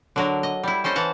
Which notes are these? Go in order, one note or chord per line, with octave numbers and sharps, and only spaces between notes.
D3 F#3 A#4
D#5
G3 E4
C#4 A4 C5 D#5
E3 F#5 A5 A#5